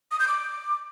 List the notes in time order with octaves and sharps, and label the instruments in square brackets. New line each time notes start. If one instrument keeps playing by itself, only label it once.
[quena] D#6
G6
D6